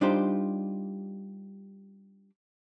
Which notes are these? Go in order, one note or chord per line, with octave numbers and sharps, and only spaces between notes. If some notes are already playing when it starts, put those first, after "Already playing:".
G3 D4 D#4 F4 G4 C5